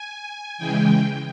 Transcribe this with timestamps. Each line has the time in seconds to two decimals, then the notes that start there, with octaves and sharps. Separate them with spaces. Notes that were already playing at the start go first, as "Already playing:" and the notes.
Already playing: G#5
0.57 C#3 E3 G#3 G5